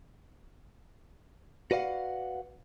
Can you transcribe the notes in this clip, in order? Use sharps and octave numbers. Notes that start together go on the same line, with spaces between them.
F#4 B4 D5 F5 F#5